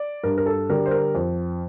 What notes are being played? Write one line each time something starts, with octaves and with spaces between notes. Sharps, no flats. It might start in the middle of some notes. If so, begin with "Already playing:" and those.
Already playing: D5
G2 A#4
A#4
A4
D3 G3 A#4
C5
A#4
F2